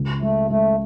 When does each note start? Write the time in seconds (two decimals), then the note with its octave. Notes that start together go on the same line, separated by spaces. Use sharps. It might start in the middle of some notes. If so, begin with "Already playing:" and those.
Already playing: C#2
0.22 G#3 A3
0.50 G#3 A3